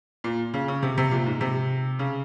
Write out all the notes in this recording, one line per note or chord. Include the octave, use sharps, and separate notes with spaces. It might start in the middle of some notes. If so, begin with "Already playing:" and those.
A#2
C#3
C#3
C3
C3
A#2
G#2
C3
C#3